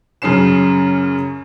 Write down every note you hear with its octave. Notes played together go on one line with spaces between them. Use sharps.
F#2 C#3 C#4 C7 E7